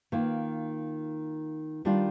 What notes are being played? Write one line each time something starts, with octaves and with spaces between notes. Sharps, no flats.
D#3 A#3 F4
D#3 G3 D4 F4